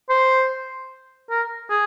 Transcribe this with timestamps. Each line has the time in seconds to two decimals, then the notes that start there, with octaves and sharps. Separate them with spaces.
0.10 C5
1.30 A#4
1.71 G#4